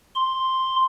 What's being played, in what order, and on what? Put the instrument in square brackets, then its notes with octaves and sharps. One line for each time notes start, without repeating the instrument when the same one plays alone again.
[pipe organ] C6